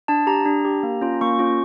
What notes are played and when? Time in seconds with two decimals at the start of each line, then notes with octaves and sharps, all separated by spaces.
0.08 D4 A5
0.27 G4 A#5
0.45 D4
0.65 G4
0.83 A#3
1.01 C#4 F4
1.21 A#3 C#6
1.39 C#4 F4